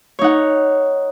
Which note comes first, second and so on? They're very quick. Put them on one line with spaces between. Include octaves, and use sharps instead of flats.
C#5 D#4 F#5